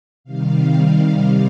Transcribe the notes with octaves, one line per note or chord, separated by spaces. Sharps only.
C3 D#3 G3 F5